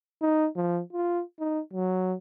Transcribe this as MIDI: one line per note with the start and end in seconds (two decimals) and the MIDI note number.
0.22 0.48 63
0.56 0.80 53
0.93 1.22 65
1.40 1.60 63
1.73 2.15 54